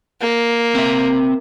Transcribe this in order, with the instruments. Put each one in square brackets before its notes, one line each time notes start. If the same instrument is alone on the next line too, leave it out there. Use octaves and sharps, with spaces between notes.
[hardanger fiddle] A#3
[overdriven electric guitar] C4 E5